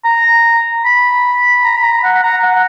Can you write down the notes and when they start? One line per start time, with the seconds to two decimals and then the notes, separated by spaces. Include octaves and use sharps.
0.05 A#5
0.85 B5
1.64 A#5
1.76 B5
1.84 A#5
2.04 F#5
2.23 A#5
2.44 F#5